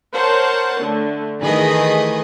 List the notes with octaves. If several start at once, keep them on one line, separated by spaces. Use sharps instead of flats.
A#4 C5 C#5 F#5 A5
D3 A3
D#3 E3 A3 G#4 B4 D#5